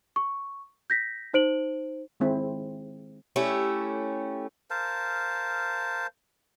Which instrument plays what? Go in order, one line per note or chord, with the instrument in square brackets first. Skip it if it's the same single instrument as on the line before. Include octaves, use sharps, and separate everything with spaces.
[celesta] C#6
G6 A#6 B6
D#4 C5 D7 F#7
[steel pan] D#3 G#3 C4 E4
[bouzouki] A3 C#4 E4 G4
[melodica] A#4 C5 F5 A5